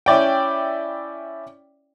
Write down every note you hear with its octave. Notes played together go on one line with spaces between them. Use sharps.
C#4 E4 D5 G5